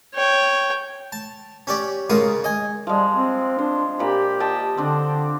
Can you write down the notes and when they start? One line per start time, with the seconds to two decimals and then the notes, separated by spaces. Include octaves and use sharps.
0.14 C#5 G5
1.12 A5
1.67 C#4 G4 D5
2.10 G#2 C#3 F4 A#4 D#6
2.44 D#5 G#5
2.87 F3 G3 G#3
3.13 C4
3.59 D4 C5
3.99 A#2 G4 B5
4.40 D#5 G5 A5
4.77 D3 C4 D4